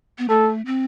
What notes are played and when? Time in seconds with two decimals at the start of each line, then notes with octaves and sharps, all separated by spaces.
0.18 B3
0.29 A3 A4
0.66 C4